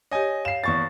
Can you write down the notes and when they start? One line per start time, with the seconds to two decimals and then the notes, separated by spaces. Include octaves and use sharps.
0.11 G4 C#5 D#5 G#5
0.45 F5 C7 E7
0.64 E2 C#6 A6